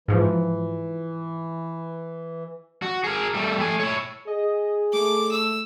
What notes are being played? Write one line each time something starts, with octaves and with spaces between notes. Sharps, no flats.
G#2 E3 F3
F#4
G#4 A#4
G3 A3
A3 G#5
E4 C#5
G#4 D#5
A3 D6
E6